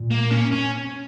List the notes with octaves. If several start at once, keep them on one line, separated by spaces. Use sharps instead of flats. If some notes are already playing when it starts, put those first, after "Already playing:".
Already playing: A#2
A#3
C#4
C#4